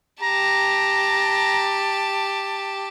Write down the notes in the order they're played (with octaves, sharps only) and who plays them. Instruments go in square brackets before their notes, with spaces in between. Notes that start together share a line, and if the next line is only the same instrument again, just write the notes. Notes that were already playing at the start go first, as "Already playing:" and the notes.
[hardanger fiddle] G4 A5 [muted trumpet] A#5